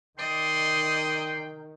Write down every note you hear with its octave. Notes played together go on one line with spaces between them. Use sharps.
D#3 D5 D#5 G5 C6